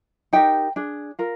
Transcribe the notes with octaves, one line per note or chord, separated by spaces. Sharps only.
D#4 G4 A#4 G5
D4 G#4
F4 A#4